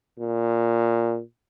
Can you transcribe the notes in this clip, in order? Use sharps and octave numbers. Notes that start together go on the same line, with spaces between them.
A#2